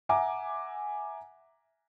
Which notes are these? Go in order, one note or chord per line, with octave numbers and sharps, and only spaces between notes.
E5 F#5 G#5 A#5 D6